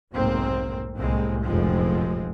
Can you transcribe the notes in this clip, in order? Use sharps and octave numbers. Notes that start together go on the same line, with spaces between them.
F1 B1 G#2 A#3 C4
C2 A2 G#3 A#3 C4
F1 A#1 F#2 F3 G#3 C4